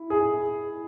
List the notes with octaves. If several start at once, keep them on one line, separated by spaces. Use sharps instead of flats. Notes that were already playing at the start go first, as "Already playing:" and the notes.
Already playing: E4
G#4